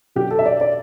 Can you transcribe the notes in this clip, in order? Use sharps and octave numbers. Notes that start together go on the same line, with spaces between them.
B2 F#3 B3 D4 G4
A4
E5
D5
D5